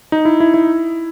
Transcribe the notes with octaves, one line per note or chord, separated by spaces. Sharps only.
D#4
E4
E4
E4